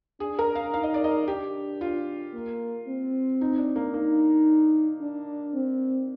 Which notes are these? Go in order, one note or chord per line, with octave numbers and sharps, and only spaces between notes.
D4 G#4
A#4
F5
D#4 F5
D#5
D5
D#5
D4 G4
F4
A#3
C4
D#4
D4
A#3
A#3 D#4
D4
C4